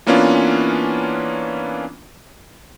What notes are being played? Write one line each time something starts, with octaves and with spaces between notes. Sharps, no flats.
E3 A#3 B3 C#4 D4 F4